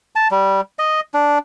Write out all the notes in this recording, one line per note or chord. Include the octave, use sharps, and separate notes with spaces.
A5
G3
D#5
D4